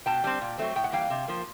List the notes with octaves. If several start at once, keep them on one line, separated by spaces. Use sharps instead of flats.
B2 G5 A5
G3 C4
A#2
F#3 A3 C4
A2 G5
F#5
E3 G3 A#3 F5 G5
C3
F3 A#3